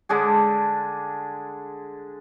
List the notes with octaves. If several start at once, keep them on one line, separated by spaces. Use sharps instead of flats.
D3 G#3 D4 G#4